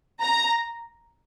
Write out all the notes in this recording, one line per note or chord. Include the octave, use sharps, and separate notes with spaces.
A#5